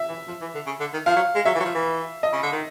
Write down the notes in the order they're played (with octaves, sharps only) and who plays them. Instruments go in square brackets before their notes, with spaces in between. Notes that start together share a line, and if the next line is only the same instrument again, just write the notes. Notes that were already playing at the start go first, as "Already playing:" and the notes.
Already playing: [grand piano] E5
[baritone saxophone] E3
F3
E3
D3
C#3
D3
D#3
[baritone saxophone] F3 [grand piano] F5
[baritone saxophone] F#3
G#3
[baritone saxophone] F#3 [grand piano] E5
[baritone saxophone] E3
F#3
F3
E3
[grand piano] D#5
[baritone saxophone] C#3
D3
D#3